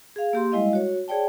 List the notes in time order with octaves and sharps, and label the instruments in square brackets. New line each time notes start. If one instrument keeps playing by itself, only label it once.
[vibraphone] G#4 F5
A#3 G4 C6
G3 G#3 E4 D#5 F5
F#4 C#5
G#4 C#5 D5 G5 A5